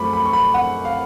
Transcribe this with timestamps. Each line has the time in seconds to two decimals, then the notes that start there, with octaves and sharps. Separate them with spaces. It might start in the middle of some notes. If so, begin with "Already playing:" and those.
Already playing: F#2 F3 A3 B5 C#6 D6
0.13 B5
0.25 C#6
0.33 B5
0.54 F#5
0.85 F5